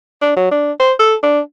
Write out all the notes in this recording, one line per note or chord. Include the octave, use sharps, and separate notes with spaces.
D4
F#3
D4
C5
A4
D4